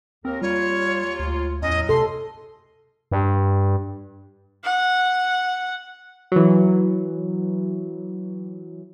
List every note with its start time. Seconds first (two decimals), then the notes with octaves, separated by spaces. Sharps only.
0.25 D#2 C4 A#4
0.42 D#2 G3 F4 C#5
1.20 D2
1.62 E2 A2 F#3 C#4 D#5
1.89 C3 A4 C6
3.12 G2
4.64 F#5
6.32 E3 F#3